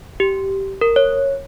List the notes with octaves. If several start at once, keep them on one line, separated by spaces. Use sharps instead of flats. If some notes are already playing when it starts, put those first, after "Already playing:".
G4
A#4
C#5